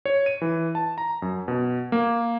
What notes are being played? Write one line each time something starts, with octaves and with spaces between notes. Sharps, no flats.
C#5
D#7
E3
A5
A#5
F#2
B2
A#3